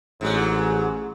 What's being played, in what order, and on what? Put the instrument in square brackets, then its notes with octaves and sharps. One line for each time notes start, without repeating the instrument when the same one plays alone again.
[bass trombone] A1 [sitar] G#2 F#3